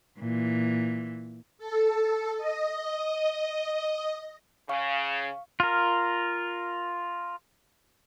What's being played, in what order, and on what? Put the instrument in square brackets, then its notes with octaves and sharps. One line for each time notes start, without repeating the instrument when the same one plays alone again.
[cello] A#2 E3
[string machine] A4
D#5
[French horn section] C#3 [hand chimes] F5 C#6
[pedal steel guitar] F4 A#4